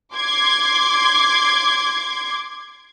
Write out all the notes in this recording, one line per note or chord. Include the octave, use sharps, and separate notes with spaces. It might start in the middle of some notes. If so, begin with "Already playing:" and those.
C6 D6 G#6